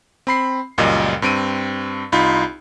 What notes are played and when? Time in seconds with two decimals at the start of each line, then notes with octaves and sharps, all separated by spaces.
0.27 C4 B5 C7
0.78 C#2 F#2 A#2 G3 D#5
1.22 G2 C4 D7 D#7
2.12 C2 D#4 F4 B5